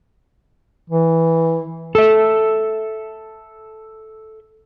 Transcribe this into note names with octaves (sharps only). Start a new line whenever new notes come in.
E3
A4 E5